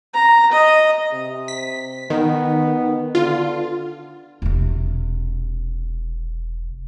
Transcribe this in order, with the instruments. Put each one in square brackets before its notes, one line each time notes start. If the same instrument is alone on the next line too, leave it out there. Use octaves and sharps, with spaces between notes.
[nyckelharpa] A#5
D#5
[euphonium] C3
[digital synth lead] B6
[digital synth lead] D#3 [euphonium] B3
[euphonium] D3 [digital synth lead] F4
[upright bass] E1 C3